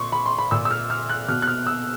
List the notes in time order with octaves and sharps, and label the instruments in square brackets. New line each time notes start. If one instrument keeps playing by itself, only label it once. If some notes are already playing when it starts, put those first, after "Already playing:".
Already playing: [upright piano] A#2 C6 C#6
B5
C6
B5
A#2 E6
E6
F6
F6
F#6
B2 F6
F#6
F6
E6